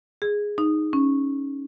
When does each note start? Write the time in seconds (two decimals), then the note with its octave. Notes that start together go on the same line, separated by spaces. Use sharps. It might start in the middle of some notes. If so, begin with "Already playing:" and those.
0.22 G#4
0.58 D#4
0.93 C#4